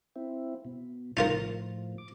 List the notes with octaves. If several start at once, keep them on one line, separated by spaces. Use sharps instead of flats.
C4 E4
B2
A2 F3 D#4 F4 A#4
D6